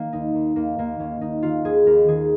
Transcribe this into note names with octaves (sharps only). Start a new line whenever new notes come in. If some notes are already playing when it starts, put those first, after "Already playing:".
Already playing: D#3 A#3
D#2 D#4
D#2
D#2 A#3
D#2 A#3
D#2 C#4
D#2 D#4
D#3 F4
D#2 G#4
D#2 A#4
D#3 G#4